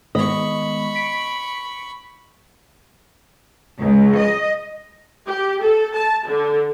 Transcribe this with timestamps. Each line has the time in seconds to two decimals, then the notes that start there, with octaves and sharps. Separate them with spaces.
0.15 D#3 G#3 B3 D#5 B5 C#6
0.95 B6 C#7 D7
3.78 C#2
4.15 D#5
5.27 G4
5.61 A4
5.95 A5
6.27 D3